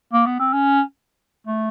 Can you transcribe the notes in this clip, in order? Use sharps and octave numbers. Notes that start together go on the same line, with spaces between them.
A#3
B3
C4
C#4
A3